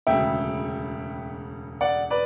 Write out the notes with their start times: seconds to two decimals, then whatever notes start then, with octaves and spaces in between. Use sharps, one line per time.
0.07 E1 D2 C#3 E5 G5
1.81 D5 F#5
2.10 B4 D5